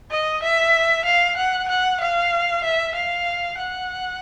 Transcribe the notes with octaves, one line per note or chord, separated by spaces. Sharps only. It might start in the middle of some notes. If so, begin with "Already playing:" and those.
D#5
E5
F5
F#5
F#5
F5
E5
F5
F#5